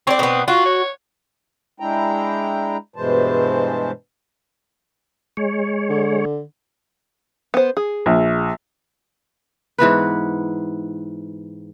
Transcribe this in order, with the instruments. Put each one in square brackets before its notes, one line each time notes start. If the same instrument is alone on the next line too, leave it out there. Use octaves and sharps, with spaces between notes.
[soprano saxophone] C4 [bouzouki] C#5 D5
[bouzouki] B2 B3
[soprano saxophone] F4 [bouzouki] F#4
[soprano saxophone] C#5
[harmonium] G#3 D4 E4 G5 A#5
G2 B2 E3 G#3 C5 A5
[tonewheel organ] G#3 C#5
[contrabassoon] D3
[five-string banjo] B3 C5
G#4
[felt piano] A#1
[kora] G#2 E3 B3 B4